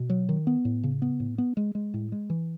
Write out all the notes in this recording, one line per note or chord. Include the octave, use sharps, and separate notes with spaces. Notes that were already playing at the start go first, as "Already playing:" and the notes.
Already playing: B2
F#3
D#3
B3
A2
C#3
B3
A2
B3
G#3
G#3
A2
G#3
E3